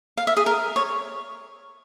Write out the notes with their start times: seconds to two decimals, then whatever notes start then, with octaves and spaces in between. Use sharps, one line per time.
0.17 F5
0.27 E5
0.37 G#4
0.46 A#4
0.76 C#5